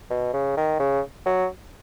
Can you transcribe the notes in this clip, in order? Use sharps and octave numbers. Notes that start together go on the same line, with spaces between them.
B2
C#3
D#3
C#3
F#3